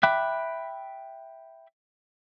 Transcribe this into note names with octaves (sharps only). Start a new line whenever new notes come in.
E5 G5 B5 D6 F#6